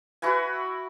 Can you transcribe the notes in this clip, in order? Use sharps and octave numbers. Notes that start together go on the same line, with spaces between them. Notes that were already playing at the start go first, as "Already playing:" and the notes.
E4 F#4 B4 G#5